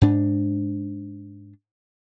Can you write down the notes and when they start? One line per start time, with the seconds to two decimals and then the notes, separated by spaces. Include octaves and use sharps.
0.02 G#2 D4